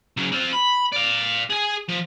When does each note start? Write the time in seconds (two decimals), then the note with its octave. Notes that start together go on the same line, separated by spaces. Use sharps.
0.17 C#3 F#3
0.32 C4 F4
0.53 B5
0.92 D5 F5
1.50 G#4 G#5
1.89 F3